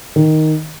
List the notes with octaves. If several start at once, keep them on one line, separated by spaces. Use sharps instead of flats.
D#3